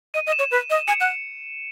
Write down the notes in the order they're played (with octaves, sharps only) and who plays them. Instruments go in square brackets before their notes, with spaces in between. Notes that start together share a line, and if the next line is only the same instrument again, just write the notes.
[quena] D#5 [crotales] D#7
[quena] D#5
[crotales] E7
[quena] C#5
B4
D#5
[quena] G#5 [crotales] C#7
[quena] F#5